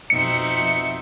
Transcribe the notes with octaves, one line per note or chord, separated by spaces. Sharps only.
F2 B2 C4 D#4 E5 C#7